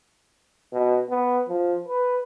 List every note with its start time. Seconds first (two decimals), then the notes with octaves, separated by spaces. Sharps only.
0.73 B2
1.10 B3
1.49 F3
1.88 B4